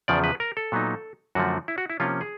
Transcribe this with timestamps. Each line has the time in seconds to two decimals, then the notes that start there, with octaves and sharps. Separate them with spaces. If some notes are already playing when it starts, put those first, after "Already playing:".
0.08 E2 C#3 F3 D5
0.24 B4
0.40 A#4
0.57 A4
0.72 A#2 F#3 B3 D#4
1.35 F#2 D3 F3 A3 F#4
1.68 E4
1.78 F#4
1.90 E4
2.00 C3 F3 A#3 C#4 F4
2.21 G#4